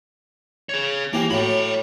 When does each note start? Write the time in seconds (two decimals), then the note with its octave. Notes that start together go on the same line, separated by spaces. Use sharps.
0.69 G#4 C#5
1.13 E3 A#3 G4
1.31 A2 F#3 G5 B5